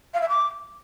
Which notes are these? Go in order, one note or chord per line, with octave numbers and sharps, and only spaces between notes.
F5
E5
D6